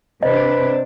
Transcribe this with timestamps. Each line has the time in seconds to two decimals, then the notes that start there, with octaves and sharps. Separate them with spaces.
0.23 C3 D4 B4 C5 D#5